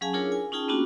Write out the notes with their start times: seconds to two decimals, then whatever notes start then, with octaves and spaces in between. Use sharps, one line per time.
0.01 F#3 C#4 G#4 F5 G#5 A5
0.13 D4 E4 F4 G#4 A#4 C#5
0.32 G#5
0.52 C#4 D#4 F4 G#4 G5 A5
0.68 A#3 B3 C#4 D4 F4 F#4